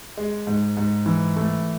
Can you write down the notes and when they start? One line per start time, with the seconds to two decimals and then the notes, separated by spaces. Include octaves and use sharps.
0.17 G#3
0.47 G#2
0.77 G#2
1.06 E3
1.36 A3